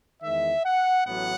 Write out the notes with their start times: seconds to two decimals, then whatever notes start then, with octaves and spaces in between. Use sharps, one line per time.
0.22 E2 D#3 G#3 E5
0.63 F#5
1.04 A1 A2 F#3 B3 F#5